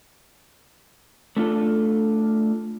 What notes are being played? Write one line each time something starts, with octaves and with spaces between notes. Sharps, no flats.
A3 D4 F4 A4